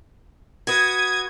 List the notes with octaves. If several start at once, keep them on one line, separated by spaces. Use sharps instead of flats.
F#4 B4 D#6 G#6